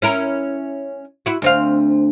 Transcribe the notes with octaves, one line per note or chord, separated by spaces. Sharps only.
C#4 E4 A#4
E4 F#4
D2 C4 F5